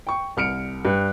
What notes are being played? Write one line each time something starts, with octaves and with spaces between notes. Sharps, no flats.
G5 C#6
C2 F6 C#7 D7
G2